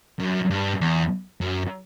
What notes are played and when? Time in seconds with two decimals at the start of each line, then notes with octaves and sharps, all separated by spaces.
0.20 F#2
0.50 G2
0.81 E2
1.41 F#2